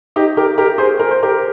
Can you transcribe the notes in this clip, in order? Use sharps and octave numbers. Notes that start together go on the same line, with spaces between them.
D#4 G4
G4 A#4
G4 A#4
G#4 C5
A#4
C5
G4 A#4